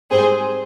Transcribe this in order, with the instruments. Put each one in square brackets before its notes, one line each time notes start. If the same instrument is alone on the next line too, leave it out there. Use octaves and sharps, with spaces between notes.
[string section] G#2 G3 C4 G#4 C5